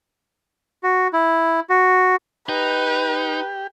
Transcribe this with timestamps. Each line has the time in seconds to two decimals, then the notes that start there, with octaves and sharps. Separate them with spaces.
0.83 F#4
1.13 E4
1.70 F#4
2.49 D#4 G4 B4